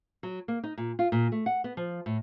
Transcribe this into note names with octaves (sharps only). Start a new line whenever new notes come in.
F#3
A#3
D#4
A#2
F4
A#2
A3
F#5
B3
F3
A2